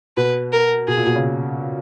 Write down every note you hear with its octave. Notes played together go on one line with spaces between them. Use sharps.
B2 B4
A#4
B2 G#4
A#2
B2
C#3